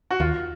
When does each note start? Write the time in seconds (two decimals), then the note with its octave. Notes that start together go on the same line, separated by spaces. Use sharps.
0.11 F#4
0.20 D#2 F4